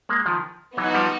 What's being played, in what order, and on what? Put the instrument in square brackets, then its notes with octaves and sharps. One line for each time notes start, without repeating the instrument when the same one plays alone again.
[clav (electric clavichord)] G#3 A#3
D#3 F3
[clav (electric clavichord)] E3 F#3 [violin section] B3 D#4 F#4
[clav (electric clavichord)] F3 G3